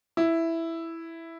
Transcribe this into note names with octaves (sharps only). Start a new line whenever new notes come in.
E4